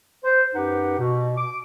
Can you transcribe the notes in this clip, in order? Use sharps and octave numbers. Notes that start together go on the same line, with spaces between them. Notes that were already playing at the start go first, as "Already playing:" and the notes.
C5
F#2 D#4 G4 B4 F#5
B2
D6